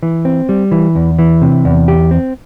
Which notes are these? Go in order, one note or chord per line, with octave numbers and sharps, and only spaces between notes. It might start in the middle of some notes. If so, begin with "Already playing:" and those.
E3
C4
G3
E3
E2
E3
C3
E2
G4
C4